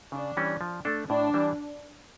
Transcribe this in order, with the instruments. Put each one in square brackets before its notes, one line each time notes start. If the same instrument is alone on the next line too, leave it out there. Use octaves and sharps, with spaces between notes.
[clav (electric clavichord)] C#3 [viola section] D4
[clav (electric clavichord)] E3 G3 C#4
F3
A3 D4 A4
[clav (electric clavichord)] A2 [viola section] D4
[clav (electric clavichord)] E3 G3